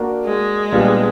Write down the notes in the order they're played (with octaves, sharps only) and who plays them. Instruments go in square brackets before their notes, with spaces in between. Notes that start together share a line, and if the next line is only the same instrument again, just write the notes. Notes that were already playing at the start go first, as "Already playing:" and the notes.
Already playing: [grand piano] A#3 D4 F#4 A#4
[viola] G#3
[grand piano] A#2 G3 B3 D4 F4